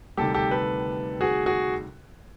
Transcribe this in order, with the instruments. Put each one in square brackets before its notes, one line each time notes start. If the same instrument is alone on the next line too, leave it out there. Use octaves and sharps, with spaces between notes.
[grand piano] D2 C3 D#3 G3 G4 A4
G4 A4
A4 B4
F#4 G#4
F#4 G#4